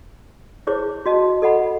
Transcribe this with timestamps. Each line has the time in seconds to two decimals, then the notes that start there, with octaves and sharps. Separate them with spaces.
0.67 E4 G#4 C5 C#5 D6
1.06 F#4 D#5 A5
1.42 A4 D#5 F#5 B5